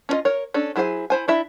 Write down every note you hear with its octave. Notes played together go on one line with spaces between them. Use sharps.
C#4 D4 F4 D#5
A#4 C#5
C#4 D4 A4
F#3 E4 G#4 C5 G#5
E4 C5 G#5
D4 E4 E5